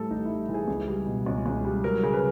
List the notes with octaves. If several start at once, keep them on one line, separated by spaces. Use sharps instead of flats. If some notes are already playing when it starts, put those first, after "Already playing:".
Already playing: A2 E3 G3 A4
A1 D#4
G3 E4
E3
G#4
C#2
G3
B2
C#2
C#2
G3
F#3 A#4
C#3
B4